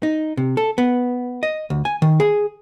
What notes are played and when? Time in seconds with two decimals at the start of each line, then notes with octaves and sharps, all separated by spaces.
0.03 D#4
0.37 C3
0.57 A4
0.78 B3
1.43 D#5
1.70 D2
1.85 G#5
2.02 D#3
2.20 G#4